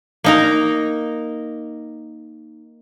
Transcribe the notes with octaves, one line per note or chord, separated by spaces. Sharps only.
A#3 D#4 A#4